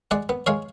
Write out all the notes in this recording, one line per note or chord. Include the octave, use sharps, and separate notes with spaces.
G#3 D5 F#5
B3
G#3 C#5 F5